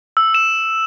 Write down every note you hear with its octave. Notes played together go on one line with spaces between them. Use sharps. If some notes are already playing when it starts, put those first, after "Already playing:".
E6
E7